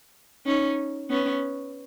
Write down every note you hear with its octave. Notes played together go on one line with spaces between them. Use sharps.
C#4 D#4
B3 C#4